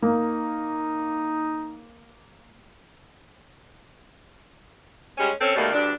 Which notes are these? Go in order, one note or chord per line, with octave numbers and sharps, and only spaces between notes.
A#3 D#4
G3 G#3 C#4
C4 C#4 A4 C#5
B2 D#3 G3 A3 A#3
D2 G2 D4